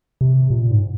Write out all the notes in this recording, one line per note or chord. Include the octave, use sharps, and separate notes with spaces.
C3
A#2
G#2